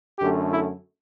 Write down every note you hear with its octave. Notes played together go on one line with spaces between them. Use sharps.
F#2 D3 A3 G4
E4